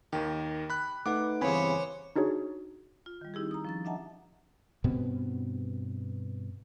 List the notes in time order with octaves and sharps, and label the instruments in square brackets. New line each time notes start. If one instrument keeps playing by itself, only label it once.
[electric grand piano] D#2 D#3 [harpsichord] G4
[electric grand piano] B5 F#6
[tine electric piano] A3 D#4 B4 [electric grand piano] F#5 D6
[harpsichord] E2 G2 C#3 [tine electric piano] C4 G#5 B5 [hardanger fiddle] C5 C#5
[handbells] D4 D#4 F#4 G#4 C#5
[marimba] F4
D#3 G3
C4 D#4 E4 G4 G#4
A#5 D#6
F3 C#4 A6
D4 D#5 E5 F#5 A5 A#5
[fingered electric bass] G2 B2 B3 C4